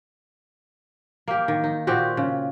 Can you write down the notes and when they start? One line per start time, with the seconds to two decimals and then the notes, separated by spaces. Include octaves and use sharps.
1.28 A#3 G4
1.48 D#3
1.64 D#4
1.87 A#2 C4 F#4 G4
2.17 C#3